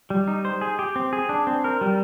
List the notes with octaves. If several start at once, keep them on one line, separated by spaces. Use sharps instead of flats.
G3
D#4
C5
G#4
G4
C4
G#4
D4
C4
A#4
G3